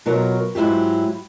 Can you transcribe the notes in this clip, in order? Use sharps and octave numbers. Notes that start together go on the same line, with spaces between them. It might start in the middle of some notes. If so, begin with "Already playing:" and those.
B2 F#3 F4 A#4 C#5
G#2 F#3 E4 F4 G4